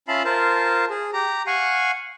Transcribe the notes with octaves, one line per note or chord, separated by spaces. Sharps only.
C#4 F4 E5 F5 A5 B5
F4 A#4 C5 A5
G#4
G4 A#5
F5 F#5 G#5 C#6